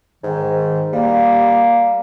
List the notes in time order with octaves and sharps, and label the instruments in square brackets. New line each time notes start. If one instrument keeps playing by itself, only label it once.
[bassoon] G#2 [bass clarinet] D#3
[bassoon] G3 [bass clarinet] A#3